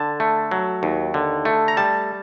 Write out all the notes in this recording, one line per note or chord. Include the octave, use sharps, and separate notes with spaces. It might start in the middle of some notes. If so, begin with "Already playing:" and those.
Already playing: D3 A5
A3
F#3
D#2
D3
A3
A#5
G3 A5